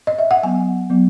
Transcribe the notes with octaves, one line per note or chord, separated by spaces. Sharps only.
D#5
E5
F#5
F#3 B3 G#5
F#3 B3